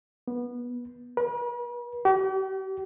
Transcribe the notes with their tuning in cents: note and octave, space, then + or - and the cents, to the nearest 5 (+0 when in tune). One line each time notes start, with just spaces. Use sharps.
B3 -20
B4 -45
G4 -40